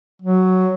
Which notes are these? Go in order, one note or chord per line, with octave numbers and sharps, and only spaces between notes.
F#3